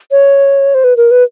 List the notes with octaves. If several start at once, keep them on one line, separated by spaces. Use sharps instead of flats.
C#5
C5
B4
A#4
B4